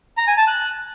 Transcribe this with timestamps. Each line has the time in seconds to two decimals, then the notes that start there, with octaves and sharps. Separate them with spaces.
0.17 A#5
0.28 G#5
0.38 A5
0.48 F#6